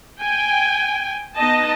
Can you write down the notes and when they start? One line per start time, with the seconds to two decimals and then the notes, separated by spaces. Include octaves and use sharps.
0.18 G5 G#5
1.36 B3 D#4 D#5 A5